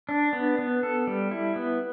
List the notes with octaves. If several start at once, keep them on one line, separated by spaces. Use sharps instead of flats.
D4
B3
B3
A4
G3
E4
B3